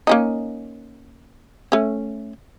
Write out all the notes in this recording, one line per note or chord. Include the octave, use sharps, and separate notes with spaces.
A#3 C#4 D#4
A3 C#4